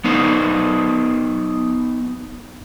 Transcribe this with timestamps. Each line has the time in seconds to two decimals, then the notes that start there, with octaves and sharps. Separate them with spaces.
0.04 B3 D#4 C5